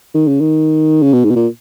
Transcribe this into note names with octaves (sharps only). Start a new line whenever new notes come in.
D#3
C#3
D#3
C#3
B2
G#2
B2
A#2